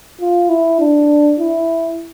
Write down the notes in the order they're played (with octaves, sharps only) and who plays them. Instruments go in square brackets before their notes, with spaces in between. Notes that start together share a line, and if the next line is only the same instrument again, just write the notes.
[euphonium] F4
E4
D4
E4